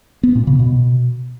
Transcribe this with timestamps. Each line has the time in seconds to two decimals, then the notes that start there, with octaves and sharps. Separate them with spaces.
0.23 B3
0.35 A#2
0.47 C#3
0.59 B2